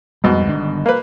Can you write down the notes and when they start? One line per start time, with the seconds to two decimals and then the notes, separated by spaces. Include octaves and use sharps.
0.24 F2 G#2 B2 G3
0.47 G1 D#3 D4
0.86 A#3 B4